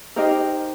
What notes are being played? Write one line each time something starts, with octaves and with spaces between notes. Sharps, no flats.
D#4 G4 A#4 C5 D#5